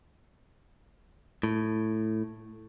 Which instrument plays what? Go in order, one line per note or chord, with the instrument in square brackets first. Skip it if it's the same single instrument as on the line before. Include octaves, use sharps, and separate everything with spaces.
[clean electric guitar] A2